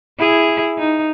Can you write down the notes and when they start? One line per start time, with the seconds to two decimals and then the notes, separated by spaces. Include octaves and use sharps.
0.19 E4 G#4
0.78 D#4